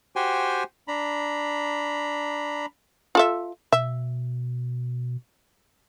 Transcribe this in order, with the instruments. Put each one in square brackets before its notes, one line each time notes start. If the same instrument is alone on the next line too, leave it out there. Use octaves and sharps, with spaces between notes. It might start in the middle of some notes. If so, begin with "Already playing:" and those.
[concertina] F#4 G4 C5 G5 G#5
D4 A#5 B5
[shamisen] F4 A4 E5
[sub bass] B2 [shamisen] E5